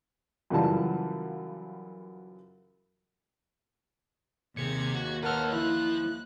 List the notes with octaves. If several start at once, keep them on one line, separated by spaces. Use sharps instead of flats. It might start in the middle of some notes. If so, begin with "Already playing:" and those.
F#2 C#3 E3 G3 F4 A5
D#2 C3 G#4 G#6 C#7
F#4
A#4 B4 C#5 F#5 A5 E6 F6
F3 E4 F#6